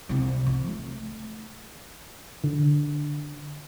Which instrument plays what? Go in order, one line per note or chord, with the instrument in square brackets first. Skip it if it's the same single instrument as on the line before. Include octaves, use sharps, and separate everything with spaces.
[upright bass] C2 C3
F3
A3
[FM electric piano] D3